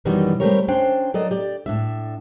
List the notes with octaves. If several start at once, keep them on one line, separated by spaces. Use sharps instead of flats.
F#2 B2 D#3 E3 G3
G3 A3 C4 G4 A#4 C#5
C#4 D4 C5 G5
F#3 A4 A#4 D5 D#5
G4 D5
A2 D4 E5